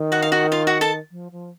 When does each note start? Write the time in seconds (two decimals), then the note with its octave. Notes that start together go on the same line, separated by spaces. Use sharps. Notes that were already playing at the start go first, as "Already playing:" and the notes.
Already playing: D#3
0.12 F#4 F#5
0.22 F5
0.32 F#4 F#5
0.52 F4 F5
0.67 F#4 F#5
0.81 A4 A5
1.11 F3
1.32 F3